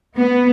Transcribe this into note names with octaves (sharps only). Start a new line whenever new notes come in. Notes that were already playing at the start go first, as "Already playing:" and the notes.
B3